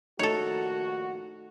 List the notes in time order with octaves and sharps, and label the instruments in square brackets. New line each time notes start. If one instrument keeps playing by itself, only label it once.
[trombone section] A#1 D#2 F#4 [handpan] A3 D#4 [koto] A4 C#5